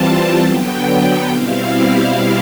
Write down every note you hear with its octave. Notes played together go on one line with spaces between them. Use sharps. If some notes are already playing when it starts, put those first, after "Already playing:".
Already playing: E3 G3 C4 F4 A5
D3 F#3 B3 G5
B2 G3 C4 E4 F5